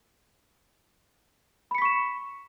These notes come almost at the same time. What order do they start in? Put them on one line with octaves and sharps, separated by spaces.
B5 C#7 B6 C#6 E7